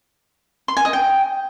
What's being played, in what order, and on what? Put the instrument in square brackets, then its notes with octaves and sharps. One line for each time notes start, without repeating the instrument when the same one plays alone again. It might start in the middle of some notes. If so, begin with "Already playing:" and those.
[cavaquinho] C6
G#5
D#5
G5